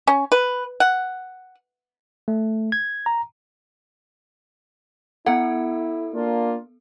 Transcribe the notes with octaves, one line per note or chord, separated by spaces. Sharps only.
C#4
B4
F#5
A3
G#6
A#5
B3 E4 A4 F#5
A#3 D4 F4